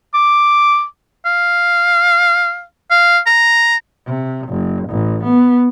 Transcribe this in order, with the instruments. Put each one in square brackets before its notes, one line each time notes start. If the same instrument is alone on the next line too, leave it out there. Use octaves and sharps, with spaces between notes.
[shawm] D6
F5
F5
A#5
[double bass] C3
F#1
A1
B3